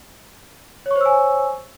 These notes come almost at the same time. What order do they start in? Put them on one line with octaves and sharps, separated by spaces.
C#5 C#6 C5 E6 G#5